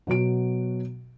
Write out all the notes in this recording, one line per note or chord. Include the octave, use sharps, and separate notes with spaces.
B2 F#3 F#4 D7